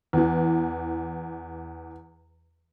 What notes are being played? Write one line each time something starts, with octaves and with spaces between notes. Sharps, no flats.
E2 E3